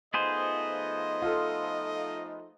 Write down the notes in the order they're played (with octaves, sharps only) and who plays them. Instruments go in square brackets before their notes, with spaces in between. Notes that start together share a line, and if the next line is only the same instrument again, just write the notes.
[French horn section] F3 A3 D#4 [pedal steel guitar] B3 G#4 C5 [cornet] D#5
[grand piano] F4 A4